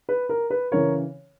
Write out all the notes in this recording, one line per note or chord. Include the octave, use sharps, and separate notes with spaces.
B4
A#4
B4
C#3 E3 A#4 C#5